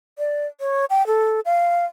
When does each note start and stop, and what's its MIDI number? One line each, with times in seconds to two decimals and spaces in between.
0.18 0.47 74
0.61 0.85 73
0.90 1.06 79
1.07 1.40 69
1.45 1.85 77